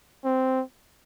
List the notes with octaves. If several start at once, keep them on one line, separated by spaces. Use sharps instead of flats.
C4